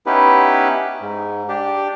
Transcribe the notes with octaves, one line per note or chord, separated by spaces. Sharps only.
B3 C#4 D#4 E4 G4 B4
G#2
D4 G4